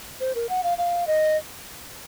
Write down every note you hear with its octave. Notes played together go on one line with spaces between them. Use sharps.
C5
A#4
F#5
F5
F5
D#5